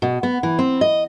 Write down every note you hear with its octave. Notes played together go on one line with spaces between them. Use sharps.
B2
B3
E3
C4
D#5